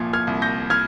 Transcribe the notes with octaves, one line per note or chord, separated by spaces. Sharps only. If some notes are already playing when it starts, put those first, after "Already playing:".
Already playing: C2 A#2 F3 G#6
F6 G#6
C2
G6 A#6
F6 G#6